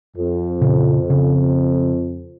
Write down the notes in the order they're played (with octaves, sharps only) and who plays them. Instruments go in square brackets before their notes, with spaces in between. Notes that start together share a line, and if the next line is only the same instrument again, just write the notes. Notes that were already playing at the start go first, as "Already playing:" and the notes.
[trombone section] F2
[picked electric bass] A#2 C#3
C#3